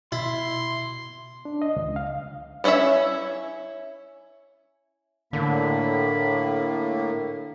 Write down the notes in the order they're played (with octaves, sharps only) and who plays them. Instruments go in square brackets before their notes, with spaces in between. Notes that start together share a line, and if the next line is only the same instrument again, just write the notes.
[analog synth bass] B2 [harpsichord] E4 [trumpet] C6
[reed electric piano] D4
D#5
C#2
F5
[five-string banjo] B3 C#4 E4 C#5 E5
[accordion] A2 A#3 [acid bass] D3 [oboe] B5